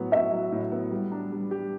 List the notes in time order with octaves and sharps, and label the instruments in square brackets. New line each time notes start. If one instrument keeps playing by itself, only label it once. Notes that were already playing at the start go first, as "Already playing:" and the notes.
Already playing: [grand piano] A2 F#3 B3 F#4
[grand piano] F#4 [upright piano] E5
[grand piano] F#3
A2
B3
G3
D4
G3
G4